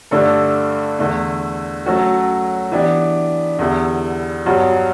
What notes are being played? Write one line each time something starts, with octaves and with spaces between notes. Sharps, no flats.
G2 D3 A3 D4 A4
E2 D3 A3
F#3 A3 C#4 F#4 A4
E3 B3 D4 G4
E2 D3 G3 B3 E4
G2 F#3 B3 F#4